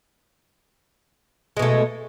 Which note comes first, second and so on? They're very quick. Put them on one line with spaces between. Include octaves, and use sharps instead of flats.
G#3 B2 A3